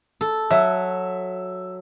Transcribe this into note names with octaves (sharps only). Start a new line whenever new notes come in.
A4
F#3 E5